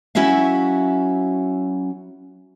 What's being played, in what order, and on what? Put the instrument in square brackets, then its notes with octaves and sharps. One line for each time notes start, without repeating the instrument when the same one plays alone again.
[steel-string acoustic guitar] F#3 C#4 E4 F#4 E5 F5